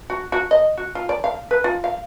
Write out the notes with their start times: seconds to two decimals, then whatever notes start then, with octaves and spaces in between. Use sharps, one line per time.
0.10 F#4
0.32 F#4
0.51 D#5
0.78 F#4
0.95 F4
1.09 D5
1.24 F5
1.51 B4
1.64 F4
1.84 F5